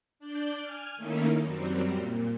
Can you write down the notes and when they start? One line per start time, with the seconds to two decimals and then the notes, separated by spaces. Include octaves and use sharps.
0.19 D4 D5 G6
0.60 G#5 F6
0.96 D#3 A3 A#3 C#4 D#4 E4
1.41 F#2 F#3 G3 C4
1.92 A#2